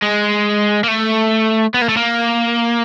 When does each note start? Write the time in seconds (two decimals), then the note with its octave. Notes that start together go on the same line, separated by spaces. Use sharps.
0.03 G#3
0.84 A#3
0.88 A3
1.74 B3
1.82 A#3
1.89 A3
1.97 A#3